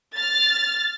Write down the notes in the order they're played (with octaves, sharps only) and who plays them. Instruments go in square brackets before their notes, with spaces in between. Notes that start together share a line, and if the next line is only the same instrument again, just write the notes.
[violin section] F6 A6